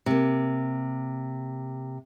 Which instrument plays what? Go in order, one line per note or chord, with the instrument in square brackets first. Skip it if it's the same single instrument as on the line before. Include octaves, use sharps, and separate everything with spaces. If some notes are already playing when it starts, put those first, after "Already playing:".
[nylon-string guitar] C3 A#3